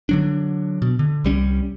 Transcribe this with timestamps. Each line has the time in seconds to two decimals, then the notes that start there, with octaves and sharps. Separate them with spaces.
0.09 D3 F#3 D4
0.82 B2
0.99 D3
1.24 C2 G3 C#4